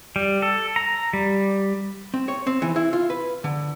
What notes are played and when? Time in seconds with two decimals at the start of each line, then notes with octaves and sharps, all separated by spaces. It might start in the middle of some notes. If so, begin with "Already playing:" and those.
0.16 G3
0.42 A4
0.76 A#5
1.13 G3
2.14 C4
2.28 C#5
2.47 C4
2.62 E3
2.76 E4
2.93 F4
3.10 B4
3.44 D3